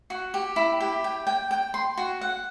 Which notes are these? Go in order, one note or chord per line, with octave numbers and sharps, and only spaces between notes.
F#4
G4
E4
G4
G5
G5
G5
C6
F#4
F#5